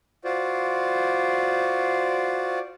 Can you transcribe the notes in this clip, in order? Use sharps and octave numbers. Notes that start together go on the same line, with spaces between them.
F4 F#4 C5 D5